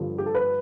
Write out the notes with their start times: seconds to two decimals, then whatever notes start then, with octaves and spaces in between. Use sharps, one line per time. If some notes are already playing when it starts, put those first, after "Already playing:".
Already playing: G2 D3 F3
0.18 G4
0.26 A4
0.35 B4